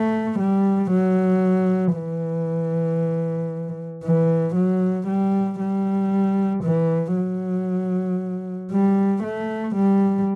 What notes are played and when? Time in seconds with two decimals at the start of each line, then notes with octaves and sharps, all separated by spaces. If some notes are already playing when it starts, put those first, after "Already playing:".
Already playing: A3
0.39 G3
0.91 F#3
1.96 E3
4.03 E3
4.55 F#3
5.07 G3
5.60 G3
6.64 E3
7.16 F#3
8.72 G3
9.24 A3
9.76 G3